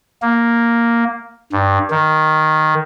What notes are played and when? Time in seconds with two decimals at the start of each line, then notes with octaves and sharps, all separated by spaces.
0.22 A#3
1.52 G2
1.91 D#3